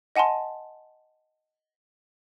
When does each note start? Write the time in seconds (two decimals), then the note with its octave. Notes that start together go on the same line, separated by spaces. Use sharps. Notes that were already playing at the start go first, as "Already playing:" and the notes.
0.16 D#5 F#5 G#5 A5 C6